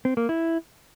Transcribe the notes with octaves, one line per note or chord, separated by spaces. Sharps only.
C4
A#3
E4